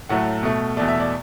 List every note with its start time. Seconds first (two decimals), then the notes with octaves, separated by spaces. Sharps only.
0.09 A2 F#3 A3 F#5
0.43 B2 A3
0.77 E2 B2 A3 D5
0.88 E5
1.00 D5